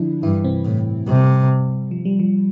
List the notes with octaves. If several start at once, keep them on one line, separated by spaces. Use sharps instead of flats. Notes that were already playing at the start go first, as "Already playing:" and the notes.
Already playing: D3 F3 D4 E4
G2 E3 E4
C3 C4
A2
C3 G3
F3
G3
F3